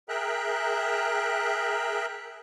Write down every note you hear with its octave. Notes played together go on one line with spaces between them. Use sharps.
G#4 A#4 E5 G5 A#5 F#6